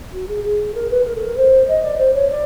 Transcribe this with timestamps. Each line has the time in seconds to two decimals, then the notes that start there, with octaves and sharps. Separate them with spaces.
0.13 F#4
0.28 G#4
0.43 G#4
0.74 A#4
0.90 B4
1.05 A#4
1.15 A4
1.26 A#4
1.36 C5
1.67 D#5
1.82 D5
1.97 C5
2.13 C#5
2.29 D5